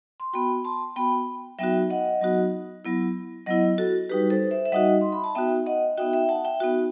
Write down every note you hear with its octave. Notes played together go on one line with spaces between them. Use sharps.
C6
B3 F#4 G5 B5
A5 C6
B3 F#4 G5 B5
F#3 B3 D#4 F#4 E5 G5
D#5 F#5
F#3 B3 D#4 F#4
F#3 B3 E4
F#3 B3 E4 D#5 F#5
F#4 A4
G3 D#4 F#4 G4 B4
A4 C5
C5 E5
E5
G3 D#4 F#4 D#5 F#5
C6
B5
A5
B3 D#4 F#4 E5 G5
D#5 F#5
B3 D#4 F#4 E5 G5
E5 G5
F#5 A5
E5 G5
B3 D#4 F#4